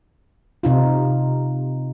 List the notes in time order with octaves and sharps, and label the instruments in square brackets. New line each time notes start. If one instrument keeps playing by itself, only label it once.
[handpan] C3 D#4 F4